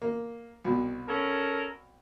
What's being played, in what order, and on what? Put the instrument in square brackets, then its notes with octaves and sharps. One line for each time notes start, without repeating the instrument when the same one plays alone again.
[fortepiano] A#3
C2 B2
[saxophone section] C#4 A4 A#4